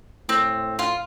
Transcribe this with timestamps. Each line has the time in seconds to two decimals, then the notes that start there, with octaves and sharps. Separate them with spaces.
0.29 A2 C4
0.79 F4